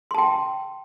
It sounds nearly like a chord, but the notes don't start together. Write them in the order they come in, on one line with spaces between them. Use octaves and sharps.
C6 A5 G5